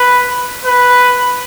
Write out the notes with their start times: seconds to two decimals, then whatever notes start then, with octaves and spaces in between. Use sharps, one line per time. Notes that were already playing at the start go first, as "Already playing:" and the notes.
Already playing: B4
0.65 B4